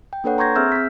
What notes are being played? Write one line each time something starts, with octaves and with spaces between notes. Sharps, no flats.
G5
A#3 D4 A4 B4 C#5 F#5
A#5 C6 C#6 G6 G#6 A#6
C4 G#4 E5 E6 F6 G6
C4 B6